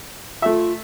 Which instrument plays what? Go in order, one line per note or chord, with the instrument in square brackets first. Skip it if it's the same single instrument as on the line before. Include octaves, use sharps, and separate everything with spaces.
[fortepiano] A3 E5 [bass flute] F4